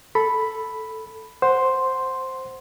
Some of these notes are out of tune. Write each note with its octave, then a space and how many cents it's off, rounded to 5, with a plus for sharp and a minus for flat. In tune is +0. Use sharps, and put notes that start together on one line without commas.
A4 +0 B5 +0
C5 +0 F#5 +0 C6 +0